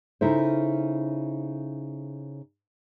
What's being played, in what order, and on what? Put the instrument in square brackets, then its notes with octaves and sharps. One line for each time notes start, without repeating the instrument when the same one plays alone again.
[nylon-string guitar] C#3 D#4 E4 A4 C5